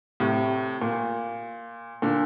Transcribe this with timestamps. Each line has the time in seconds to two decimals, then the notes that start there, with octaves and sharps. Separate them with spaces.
0.20 A2 C3
0.82 A#2
2.02 A#2 D3